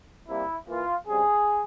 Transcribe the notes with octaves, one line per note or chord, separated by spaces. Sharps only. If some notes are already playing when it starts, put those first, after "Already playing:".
C3 G3 A#3 E4
E3 A#3 F4
C#3 G3 C4 G#4